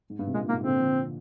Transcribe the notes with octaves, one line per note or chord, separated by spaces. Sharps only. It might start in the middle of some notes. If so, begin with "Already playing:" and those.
G#2
G2
C3
G2 A#2 G#3
G#2 C3 A#3
A#2 D3 C4
D3 F3